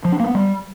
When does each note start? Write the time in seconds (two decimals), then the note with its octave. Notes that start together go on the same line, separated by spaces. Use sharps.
0.05 F3
0.12 D4
0.20 A#3
0.27 B3
0.35 G3